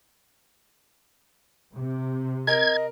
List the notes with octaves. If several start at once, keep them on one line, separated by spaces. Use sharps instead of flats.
C3
A#4 D#5 G#6